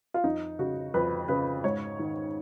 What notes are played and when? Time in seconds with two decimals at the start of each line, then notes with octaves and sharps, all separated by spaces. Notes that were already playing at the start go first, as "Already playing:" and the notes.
0.14 F4
0.24 F2 D#4
0.59 C#3 F#4
0.94 F2 B4
1.28 C#3 B4
1.64 G#2 C#5
1.99 D#3